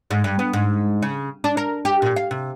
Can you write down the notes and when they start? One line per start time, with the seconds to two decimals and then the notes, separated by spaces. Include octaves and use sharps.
0.11 G#2
0.24 G2
0.39 B3
0.53 G#2
1.02 C#3
1.44 D4
1.57 A#4
1.85 G4
2.02 A#2
2.16 F5
2.31 C3